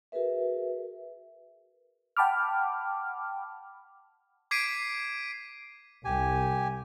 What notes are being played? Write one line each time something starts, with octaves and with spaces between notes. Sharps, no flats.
F#4 G#4 A#4 B4 E5
F#5 G5 A5 B5 D6 F6
D6 G#6 B6 C7 D7 D#7
C2 G4 G#5